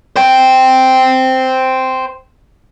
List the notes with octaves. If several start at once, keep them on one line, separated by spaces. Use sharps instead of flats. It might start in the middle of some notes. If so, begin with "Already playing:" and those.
C5 G5